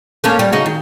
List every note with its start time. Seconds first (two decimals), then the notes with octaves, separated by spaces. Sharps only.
0.24 A3 A#3 C#4
0.39 G3
0.52 C#3 D#4 F#4
0.66 D#3